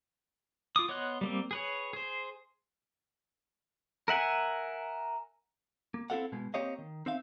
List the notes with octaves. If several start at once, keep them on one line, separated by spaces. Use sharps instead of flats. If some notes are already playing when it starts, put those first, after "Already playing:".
F4 D6 D#6
B3 C#5 D#5 C6 F#6
G3 A#3 C4
G#4 B4 C#5
G#4 C5
A#4 E5 F#5 G#5
A#3
C4 E4 F#4 A4 F5 F#5
B2 G#3
A#3 C4 G4 C#5 D#5 F5
D#3
C4 D#4 E5 F5